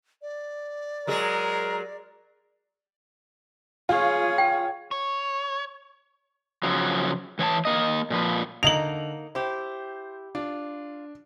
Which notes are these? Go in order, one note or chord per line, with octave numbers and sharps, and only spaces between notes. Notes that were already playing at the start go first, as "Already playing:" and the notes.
D5
F#3 G#3 G#4 A#4
F4 G#4 C#5
G5
C#5
C#3 F3 F#3
E3 C#5 G5 A5
A#3 D#5
A#2 F3 B4
D3 A#3 D#4 F7 F#7
E4 G4 C5
D4 F4